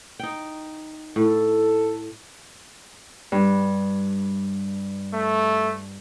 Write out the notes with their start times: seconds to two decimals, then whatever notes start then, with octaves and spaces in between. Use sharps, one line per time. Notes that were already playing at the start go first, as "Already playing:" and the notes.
0.19 D#4 G5
1.16 A2 A4
3.32 G2
5.14 A3